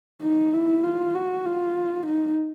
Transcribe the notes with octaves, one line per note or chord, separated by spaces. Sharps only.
D#4
E4
F4
F#4
F4
D#4